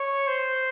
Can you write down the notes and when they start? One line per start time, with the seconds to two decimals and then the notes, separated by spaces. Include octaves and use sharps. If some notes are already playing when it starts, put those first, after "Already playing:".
Already playing: C#5
0.27 C5